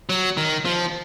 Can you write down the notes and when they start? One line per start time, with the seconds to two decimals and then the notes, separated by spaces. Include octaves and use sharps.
0.09 F#3
0.37 D#3
0.65 F3